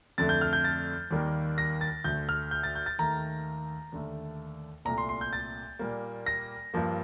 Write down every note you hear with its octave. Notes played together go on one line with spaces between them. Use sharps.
F2 D3 A3 A6
G6
F6
G6
A6
D#2 D#3 G3 A#3
A#6
A6
D2 D3 A3 G6
F6
G6
A6
G6
A6
D#2 D#3 A3 A#5
D#2 D3 A3
C2 A#2 A3 A#5
C6
C6
G6
A6
A#2 G3 A#3
A#6
G2 F3 A#3